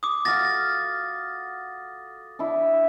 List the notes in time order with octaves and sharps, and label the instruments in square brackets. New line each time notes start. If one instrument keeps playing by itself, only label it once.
[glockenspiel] D6 D#6
[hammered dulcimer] F#4 A4 F5 [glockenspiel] A6 A#6
[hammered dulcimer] D4 E4